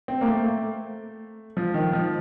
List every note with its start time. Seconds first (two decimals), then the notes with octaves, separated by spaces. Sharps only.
0.08 C4
0.21 A#3
0.27 A3
1.57 F3
1.74 D#3
1.93 F3